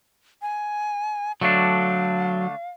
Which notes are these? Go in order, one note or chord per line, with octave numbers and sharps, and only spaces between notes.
G#5
D3 F#3 A3 D4 F5